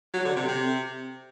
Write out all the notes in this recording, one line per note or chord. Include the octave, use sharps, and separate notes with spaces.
F#3
D3
C3
C3